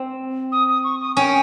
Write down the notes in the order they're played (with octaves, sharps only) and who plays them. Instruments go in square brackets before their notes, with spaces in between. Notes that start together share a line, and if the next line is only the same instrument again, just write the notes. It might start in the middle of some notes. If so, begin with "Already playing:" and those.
Already playing: [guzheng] C4
[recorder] D#6
D#6
C#6
D#6
[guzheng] C#4 [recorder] G5